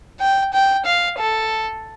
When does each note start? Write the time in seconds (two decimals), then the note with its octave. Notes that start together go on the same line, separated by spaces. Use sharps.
0.20 G5
0.53 G5
0.85 F5
1.19 A4